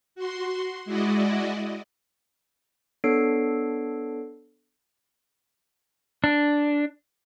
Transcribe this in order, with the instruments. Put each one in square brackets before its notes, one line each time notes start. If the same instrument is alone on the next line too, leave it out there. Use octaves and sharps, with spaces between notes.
[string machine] F#4 C6
G#3 E4 F#4 D5 D#5
[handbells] B3 D4 A4 C#5 C7 D7
[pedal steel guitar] D4